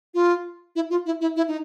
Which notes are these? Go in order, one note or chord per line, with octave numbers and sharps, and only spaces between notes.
F4
E4
F4
E4
E4
E4
D#4